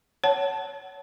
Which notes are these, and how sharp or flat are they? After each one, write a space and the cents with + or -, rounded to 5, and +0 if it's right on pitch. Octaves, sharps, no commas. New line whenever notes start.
C#5 +10 F#5 +25 A5 +0